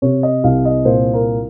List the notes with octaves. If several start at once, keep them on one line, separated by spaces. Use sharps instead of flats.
C3 C#5
D#5
C2 F5
D#5
A#2 C5
A#4